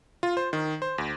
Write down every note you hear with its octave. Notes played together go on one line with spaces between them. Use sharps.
F4
C5
D#3
C5
D2